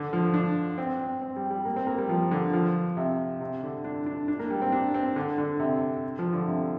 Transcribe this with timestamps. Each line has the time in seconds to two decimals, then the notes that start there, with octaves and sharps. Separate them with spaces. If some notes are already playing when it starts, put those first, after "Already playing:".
Already playing: D3
0.13 F3
0.34 D4
0.78 C4
1.00 C4
1.22 C4
1.36 G3
1.51 G3
1.65 A#3
1.76 C4
1.87 A#3
1.98 G3
2.09 F3
2.31 D3
2.53 F3
2.97 C3
3.41 C3
3.63 D3
3.84 D4
4.06 D4
4.28 D4
4.39 A#3
4.50 G3
4.62 C4
4.72 D4
4.94 C4
5.16 D3
5.38 D3
5.60 C3
6.19 F3
6.33 D3
6.48 C3